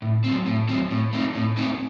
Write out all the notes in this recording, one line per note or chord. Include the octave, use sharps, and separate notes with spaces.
A2
F#3 C4
A2
F#3 C4
A2
A3 C4 D#4
A2
A3 C4 D#4